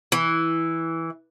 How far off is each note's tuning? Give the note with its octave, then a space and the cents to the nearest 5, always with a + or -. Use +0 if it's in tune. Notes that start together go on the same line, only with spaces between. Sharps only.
E3 -5